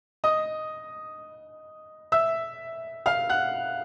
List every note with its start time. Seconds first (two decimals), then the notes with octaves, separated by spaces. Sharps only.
0.24 D#5 D#6
2.12 E5 E6
3.06 F5 F6
3.29 F#5 F#6